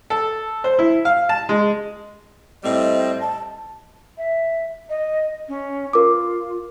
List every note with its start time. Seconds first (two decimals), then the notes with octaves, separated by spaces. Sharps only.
0.10 A4
0.64 C5
0.79 E4
1.05 F5
1.29 A5
1.49 G#3
2.64 A2 G3 C4 D#5
3.21 A5
4.18 E5
4.89 D#5
5.48 C#4
5.93 F4 A#4 D6